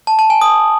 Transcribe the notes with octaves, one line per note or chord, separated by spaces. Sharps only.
A5
A5
G#5
D#6